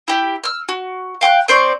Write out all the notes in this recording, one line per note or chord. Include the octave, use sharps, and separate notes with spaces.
E4 G4
E6 F6
F#4
F5 G5 D6 F#6
C4 C5 D5 C#6